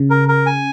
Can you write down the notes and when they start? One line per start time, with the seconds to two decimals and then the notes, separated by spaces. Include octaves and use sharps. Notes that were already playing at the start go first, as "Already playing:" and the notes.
Already playing: C#3
0.10 A#4
0.28 A#4
0.46 G#5